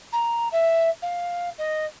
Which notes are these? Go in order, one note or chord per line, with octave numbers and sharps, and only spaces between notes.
A#5
E5
F5
D#5